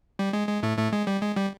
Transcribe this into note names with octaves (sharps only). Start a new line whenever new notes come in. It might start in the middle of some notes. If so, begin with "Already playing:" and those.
G3
G#3
G#3
A2 A3
A2 A3
G#3
G3
G#3
G3